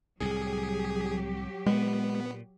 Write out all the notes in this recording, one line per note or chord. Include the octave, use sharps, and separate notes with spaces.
C2 A2 F#3 G4 G#4
A#2 G#3 B3